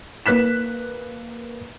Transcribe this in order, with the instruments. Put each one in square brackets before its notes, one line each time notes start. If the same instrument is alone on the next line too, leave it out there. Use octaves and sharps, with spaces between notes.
[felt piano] A#3 B4 F#6 B6 E7